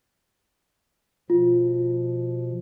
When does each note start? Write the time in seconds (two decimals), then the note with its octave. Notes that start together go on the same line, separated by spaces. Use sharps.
1.30 B2 F3 F4